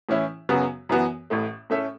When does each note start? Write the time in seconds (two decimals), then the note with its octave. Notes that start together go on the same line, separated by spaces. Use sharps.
0.09 A2 E3 C#4 E4
0.49 F#2 C#3 F#3 B3 F#4
0.89 F#2 E3 B3 F#4
1.30 A1 A2 A3
1.70 A2 A3 C#4 A4 E5